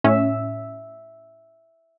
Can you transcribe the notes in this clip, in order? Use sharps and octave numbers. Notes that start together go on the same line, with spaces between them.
A2 C#4 E5